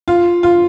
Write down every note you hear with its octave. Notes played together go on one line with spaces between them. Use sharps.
F4
F4